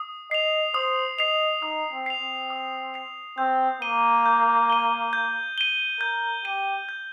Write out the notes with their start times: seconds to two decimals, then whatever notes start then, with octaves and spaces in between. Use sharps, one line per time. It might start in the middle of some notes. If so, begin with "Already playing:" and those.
Already playing: D#6
0.31 D#5 C7 F7
0.74 C5 D#6
1.19 D#5 C7 F7
1.63 D#4 D#6
1.92 C4
2.06 C7 F7
2.21 C4
2.50 D#6
2.94 C7 F7
3.38 C4 G6
3.81 A#3 D#7 G7
4.26 G6
4.70 D#7 G7
5.13 G6
5.58 D#7 G7
6.00 A#4 G6
6.45 G4 D#7 G7
6.89 G6